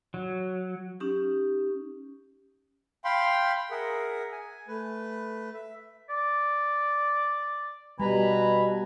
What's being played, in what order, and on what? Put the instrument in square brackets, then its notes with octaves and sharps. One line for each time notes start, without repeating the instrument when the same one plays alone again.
[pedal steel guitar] F#3
[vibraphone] C#4 D#4 G4
[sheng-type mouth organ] F5 G5 B5 C6
G#4 A#4 E5 F#5
G#5
A3 B4
E5
[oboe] D5
[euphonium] B2 [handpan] G3 [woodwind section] B4 A#5 B5 [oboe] G#5